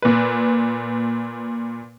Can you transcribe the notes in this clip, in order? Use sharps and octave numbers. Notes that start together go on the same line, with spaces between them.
A#2 B4